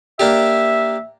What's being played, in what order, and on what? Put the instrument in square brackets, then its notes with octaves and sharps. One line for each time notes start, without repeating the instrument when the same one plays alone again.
[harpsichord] A#3 D4 G4 [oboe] E5